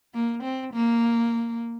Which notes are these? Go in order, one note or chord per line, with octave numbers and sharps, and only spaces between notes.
A#3
C4
A#3